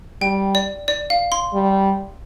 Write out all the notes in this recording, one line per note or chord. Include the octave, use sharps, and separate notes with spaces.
G3 G5
D5
D5
F5
C6
G3